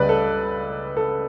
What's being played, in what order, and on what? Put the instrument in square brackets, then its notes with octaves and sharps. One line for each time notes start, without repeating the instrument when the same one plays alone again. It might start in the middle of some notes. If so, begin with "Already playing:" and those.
Already playing: [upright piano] C#2 C#3 G3 B4 D5
A4
A4